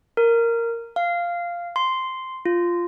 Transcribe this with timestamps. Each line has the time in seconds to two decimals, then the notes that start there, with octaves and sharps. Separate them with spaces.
0.17 A#4
0.96 F5
1.76 C6
2.46 F4